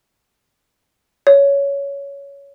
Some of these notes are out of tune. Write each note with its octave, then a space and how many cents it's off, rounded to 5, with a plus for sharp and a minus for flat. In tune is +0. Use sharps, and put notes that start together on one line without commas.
C#5 +15